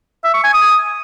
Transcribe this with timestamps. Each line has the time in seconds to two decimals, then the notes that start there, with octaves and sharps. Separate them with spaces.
0.24 E5
0.34 C#6
0.44 G#5
0.54 D#6